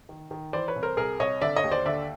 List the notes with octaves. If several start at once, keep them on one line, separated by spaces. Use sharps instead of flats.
D#3
D#3
E3 C5 D5
B4 C#5
C2
A#4 C5
C2 G#4 A#4
C2 C#5 D#5
D3 D5 E5
C#5 D#5
D#2
C5 D5
D3 D5 E5